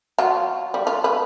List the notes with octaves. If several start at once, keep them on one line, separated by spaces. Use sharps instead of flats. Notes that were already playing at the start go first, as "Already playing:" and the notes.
F#3 F4
G3
F4
B4